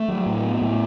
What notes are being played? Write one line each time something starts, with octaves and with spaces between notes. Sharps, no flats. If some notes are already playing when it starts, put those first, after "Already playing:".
Already playing: A3
F#3
A2
B3
A2